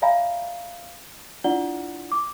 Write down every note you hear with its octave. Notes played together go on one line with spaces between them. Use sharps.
D5 E5 F5 G#5 A#5 B5
D4 E4 F4 D5 F#5 G7
D6